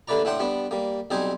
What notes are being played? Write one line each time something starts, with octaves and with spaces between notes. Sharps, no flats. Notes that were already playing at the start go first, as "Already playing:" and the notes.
D#2 D3 A3 B4 D5 A#5
A2 A3 D4 F#5 G5 C6
G3 B3 D4
G3 A#3
B1 G3 C4 D#4 C5 G#5